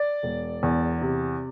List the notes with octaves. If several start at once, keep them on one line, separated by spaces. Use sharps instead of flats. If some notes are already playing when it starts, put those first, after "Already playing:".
Already playing: D5
E1
E2
C3